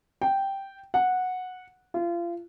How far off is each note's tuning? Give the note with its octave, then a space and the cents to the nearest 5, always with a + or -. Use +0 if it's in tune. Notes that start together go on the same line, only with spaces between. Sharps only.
G5 -5
F#5 -10
F4 -30